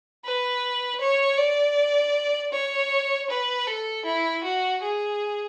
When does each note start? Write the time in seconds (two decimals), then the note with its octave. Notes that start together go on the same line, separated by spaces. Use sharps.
0.25 B4
1.01 C#5
1.38 D5
2.53 C#5
3.30 B4
3.67 A4
4.05 E4
4.44 F#4
4.82 G#4